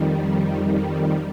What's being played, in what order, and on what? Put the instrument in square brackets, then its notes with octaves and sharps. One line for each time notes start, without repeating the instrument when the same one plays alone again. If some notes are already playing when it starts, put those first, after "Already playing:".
Already playing: [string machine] F2 D#3 G3